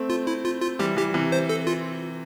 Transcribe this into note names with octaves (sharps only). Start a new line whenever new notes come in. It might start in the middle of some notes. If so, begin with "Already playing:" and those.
Already playing: A3 C4
F4
E4
F4
F4
E3 G3 G4
E3 G3 G4
C3 E3
C5
A4
F4